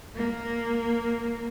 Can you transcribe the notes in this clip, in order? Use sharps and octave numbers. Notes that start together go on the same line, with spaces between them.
A#3